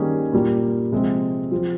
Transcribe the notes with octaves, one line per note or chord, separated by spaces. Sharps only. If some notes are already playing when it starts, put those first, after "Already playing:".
Already playing: D#3 G3 A#3 C#4 G#4
A#2 G3 A#3 F4
C3 F3 G#3 C4
F3 C4 F4 G#4 C5